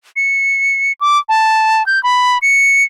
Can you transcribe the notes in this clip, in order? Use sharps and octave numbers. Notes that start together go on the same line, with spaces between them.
C#7
D6
A5
G6
B5
C#7